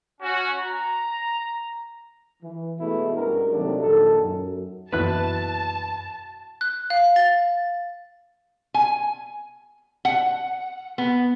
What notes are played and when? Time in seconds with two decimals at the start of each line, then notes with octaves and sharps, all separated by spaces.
0.21 C#4 F#4
0.60 A#5
2.43 E3
2.79 B2 E3 G#3 A3 B3 E4
3.16 G2 G#3 C#4 F#4 A#4
3.52 D#2 C3 D#3 F#3 A3 D4
3.82 A#1 A#2 D#3 A4
4.19 F#2
4.92 F#2 B2 E3 A#3 E4 B4 A5 F#6
6.61 F#6
6.90 F5
7.16 A6
8.74 G#5
10.05 F#5
10.98 B3